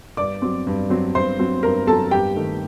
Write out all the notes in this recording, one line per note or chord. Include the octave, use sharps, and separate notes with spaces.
G2 D5 D6
F#3 C4
G2
F#3 C4
G2 C5 C6
F#3 C4
G2 A#4 A#5
F#3 C4 A4 A5
G2 G4 G5
D#3 A3